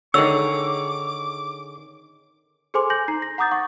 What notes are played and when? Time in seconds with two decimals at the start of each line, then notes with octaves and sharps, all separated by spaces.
0.14 D3 D#3 G#4 C#5 D6 E6
2.74 G#4 A4 C5 G#5 C6 D6
2.90 G#5 G6 A#6 F#7
3.08 D#4 A#5 C7
3.22 A#6
3.38 F#5 A#5 D6 D#6 G6 A6
3.51 F#5 C#6